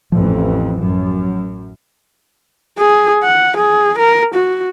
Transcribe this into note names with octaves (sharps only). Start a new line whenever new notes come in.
A1 F2 E3 F3
F#2
G#4
F#5
G#4
A#4
F#4